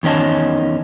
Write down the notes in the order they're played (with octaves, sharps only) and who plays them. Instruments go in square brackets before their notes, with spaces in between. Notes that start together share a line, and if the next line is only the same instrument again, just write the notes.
[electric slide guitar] E2 D#3 C#4 D#5 A5